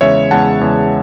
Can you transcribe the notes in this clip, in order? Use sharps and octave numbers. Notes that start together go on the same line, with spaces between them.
E2 C#3 G#3 C#5 E5
E2 C#3 G#3 F#5 A5
E2 C#3 G#3